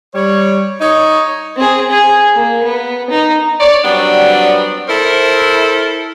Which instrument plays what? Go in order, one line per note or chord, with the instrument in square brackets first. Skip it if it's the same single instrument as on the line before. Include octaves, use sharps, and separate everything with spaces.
[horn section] G3 C#5
D#4 C#5
[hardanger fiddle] C4 G#4
G#4
A#3
B3
D#4
[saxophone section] C#5 D5
F#3 G3 B3 C4 D4
E4 A4 A#4 C5